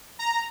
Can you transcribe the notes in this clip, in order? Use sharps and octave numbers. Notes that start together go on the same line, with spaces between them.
A#5